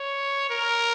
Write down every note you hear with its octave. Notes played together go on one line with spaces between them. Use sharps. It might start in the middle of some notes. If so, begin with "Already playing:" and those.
Already playing: C#5
A#4